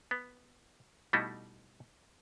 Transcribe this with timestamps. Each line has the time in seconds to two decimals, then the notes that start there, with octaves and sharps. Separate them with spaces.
0.11 B3
1.13 B2 G3 A3 D#4 E4 A4